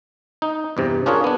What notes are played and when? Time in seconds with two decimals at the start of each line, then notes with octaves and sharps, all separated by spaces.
0.42 D#4
0.77 E2 G2 C3
1.06 C#4 D4 F4 G#4 A#4 C#5
1.24 B3 D4